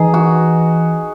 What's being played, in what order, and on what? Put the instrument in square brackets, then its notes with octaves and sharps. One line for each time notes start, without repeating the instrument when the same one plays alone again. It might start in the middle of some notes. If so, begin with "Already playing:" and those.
Already playing: [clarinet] E3 [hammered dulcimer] D#4 G#4
[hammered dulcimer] F#4